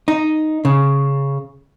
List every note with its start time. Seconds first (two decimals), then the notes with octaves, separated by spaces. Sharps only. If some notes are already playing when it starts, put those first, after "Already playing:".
0.08 D#4
0.65 C#3